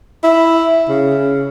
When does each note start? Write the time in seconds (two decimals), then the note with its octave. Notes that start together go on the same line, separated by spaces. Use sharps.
0.24 E4
0.88 C#3